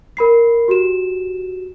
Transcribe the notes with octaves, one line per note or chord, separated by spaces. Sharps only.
A#4 B5 C7
F#4 G4 E7